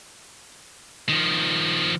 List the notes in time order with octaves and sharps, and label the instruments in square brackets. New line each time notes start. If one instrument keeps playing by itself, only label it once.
[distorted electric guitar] D#3 F3